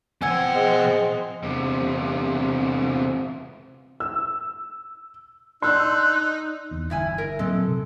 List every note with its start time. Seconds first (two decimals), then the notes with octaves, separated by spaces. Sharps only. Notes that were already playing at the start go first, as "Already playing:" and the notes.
0.22 B2 F3 C4 F#5 G#5 E6 G#6
0.55 G#3
1.43 E2 C3
4.00 E6
5.62 D4 D#4 C6 E6 F#6
6.71 E2
6.90 G1 B2 E4 G#5
7.18 A#4
7.39 A#2 F#3 G#3 C4 A4
7.66 C3